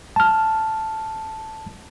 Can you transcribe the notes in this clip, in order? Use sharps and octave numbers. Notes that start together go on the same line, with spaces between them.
A5 F6